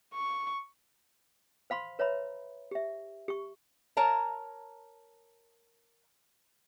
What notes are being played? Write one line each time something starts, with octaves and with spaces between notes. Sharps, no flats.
C#6
C5 F5 B5 C6
B4 C#5 E5 A#5 B5
G4 E5
G4 C#6
A#4 C#5 A5 A#5